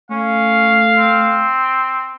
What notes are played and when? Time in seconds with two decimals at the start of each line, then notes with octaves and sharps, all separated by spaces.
0.11 A3 C#4 F5
0.98 C4